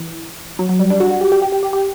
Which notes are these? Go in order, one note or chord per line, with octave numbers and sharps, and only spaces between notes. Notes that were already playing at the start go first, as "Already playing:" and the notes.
Already playing: E3
F#3
F#3
G3
D4
F#4
F#4
G4
G4
G4
G4
G4
G4